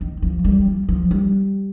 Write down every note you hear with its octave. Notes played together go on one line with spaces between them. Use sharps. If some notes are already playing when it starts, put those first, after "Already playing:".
D#3
F3
G3
F3
F3
G3